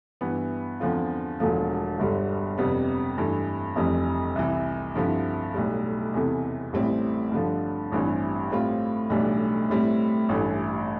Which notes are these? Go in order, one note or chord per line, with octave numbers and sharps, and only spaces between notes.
G2 E3 B3
E2 D3 F3 C4 F4
E1 E2 D3 F3 A3
G1 G2 D3 G3
F2 C3 G3 B3
G2 E3 A3
F1 F2 E3 G3
C2 C3 E3
G2 D3 F3 C4 E4
B1 A2 G3
E2 C3 E3 A3
A1 A2 G3 C4 E4
G2 D3 F3
A1 G2 E3 G3 C4
A2 G3 C4 F4
B1 A2 E3 G3 D4
A2 G3 C4 E4
A1 G2 E3 A3